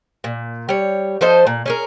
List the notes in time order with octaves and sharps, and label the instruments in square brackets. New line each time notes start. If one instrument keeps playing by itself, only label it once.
[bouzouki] A#2
G3 C#5
F3 A4 C5 D#5
A#2
C#4 G#4 A#4